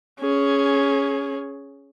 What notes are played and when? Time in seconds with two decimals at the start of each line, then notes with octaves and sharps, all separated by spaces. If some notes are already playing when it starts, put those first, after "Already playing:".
0.21 C#4 G#4